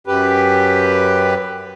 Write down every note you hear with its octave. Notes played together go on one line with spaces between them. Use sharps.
F#2 G4 B4